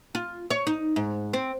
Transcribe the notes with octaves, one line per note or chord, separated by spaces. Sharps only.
F4
C#5
D#4
G#2
C4